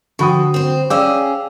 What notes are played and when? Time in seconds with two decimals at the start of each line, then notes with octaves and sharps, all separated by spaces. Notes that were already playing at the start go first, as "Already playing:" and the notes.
0.19 D3 F3 F#4 G5 B5 C#6 D#6
0.54 C4 C5
0.90 C#4 G#4 D5 F5 G5 D6 E6